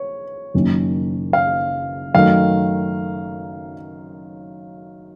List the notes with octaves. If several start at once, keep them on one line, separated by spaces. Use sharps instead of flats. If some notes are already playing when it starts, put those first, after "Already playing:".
Already playing: C#5
F#1 F#2 D#3 A#3 C#4
F5
F#2 D#3 A3 F5